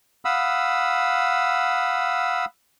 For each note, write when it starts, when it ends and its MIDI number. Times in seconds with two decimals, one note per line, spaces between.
0.25 2.45 77
0.25 2.45 78
0.25 2.45 83
0.25 2.45 87
0.25 2.45 88